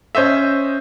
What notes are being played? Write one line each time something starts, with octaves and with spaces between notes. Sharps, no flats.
C#4 C5 D#5 E5